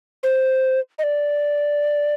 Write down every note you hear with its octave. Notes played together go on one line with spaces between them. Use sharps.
C5
D#5
D5